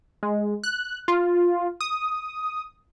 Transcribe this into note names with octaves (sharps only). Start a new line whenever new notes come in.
G#3
F#6
F4
D#6